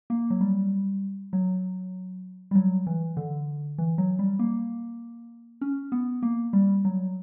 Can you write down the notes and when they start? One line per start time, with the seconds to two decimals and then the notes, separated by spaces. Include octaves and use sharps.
0.10 A#3
0.30 F#3
0.41 G3
1.33 F#3
2.51 G3
2.55 F#3
2.87 E3
3.17 D3
3.78 E3
3.98 F#3
4.19 G3
4.39 A#3
5.61 C#4
5.92 B3
6.23 A#3
6.53 G3
6.85 F#3